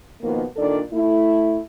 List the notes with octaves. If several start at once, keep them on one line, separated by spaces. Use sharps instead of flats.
B2 D#3 F3 A#3 B3
A#2 D#3 D4 A4 D5
A3 E4